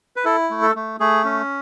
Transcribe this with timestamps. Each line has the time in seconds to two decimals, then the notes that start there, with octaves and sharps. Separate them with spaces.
0.16 B4
0.25 E4 A4
0.50 A3
0.62 A4
0.75 A3
1.00 A3 G#4
1.24 C#4